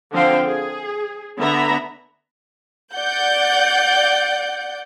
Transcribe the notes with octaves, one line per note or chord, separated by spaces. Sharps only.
D3 F3 C4 C5 F5 G5
G#4
D3 B3 E5 A#5 B5
D5 F#5 G6